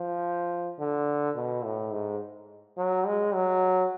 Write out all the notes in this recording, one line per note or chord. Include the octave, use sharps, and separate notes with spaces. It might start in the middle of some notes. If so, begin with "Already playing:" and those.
Already playing: F3
D3
B2
A2
G#2
F#3
G#3
F#3